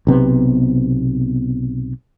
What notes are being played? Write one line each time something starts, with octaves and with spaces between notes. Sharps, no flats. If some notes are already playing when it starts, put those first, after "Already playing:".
B1 C3 B3